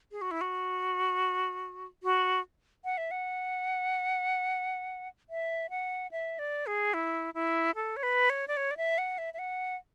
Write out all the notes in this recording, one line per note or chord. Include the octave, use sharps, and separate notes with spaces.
G#4
F#4
E4
F#4
F#4
F#5
E5
F#5
E5
F#5
E5
D5
G#4
E4
E4
A4
C#5
B4
C#5
D5
C#5
D5
E5
F#5
E5
E5
F#5